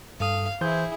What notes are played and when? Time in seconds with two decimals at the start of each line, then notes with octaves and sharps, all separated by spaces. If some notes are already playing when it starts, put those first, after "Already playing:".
0.20 G2 A4 F5 D#6
0.61 E3 E4 G#4 C5 G6